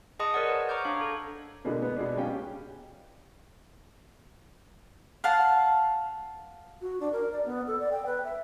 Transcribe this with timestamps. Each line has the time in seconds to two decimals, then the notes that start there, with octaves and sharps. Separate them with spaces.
0.19 G#4 D#5 F#5 A5 C6 D#6
0.34 A#4 C#5 D5 F#5
0.47 B4 C5
0.69 C#5 A#5 C#6 D6 F6 G6
0.85 D4 F5
1.01 A4
1.65 B2 D3 G#3 A#3
1.82 B3
1.96 B2 G#3 D4
2.17 A#1 C#4 G4 F5 G5
5.24 F5 F#5 A5
6.82 F#4
7.00 D4
7.12 A#4
7.32 D5
7.45 B3
7.67 A4
7.80 D5
7.91 G5
8.06 B4
8.24 E5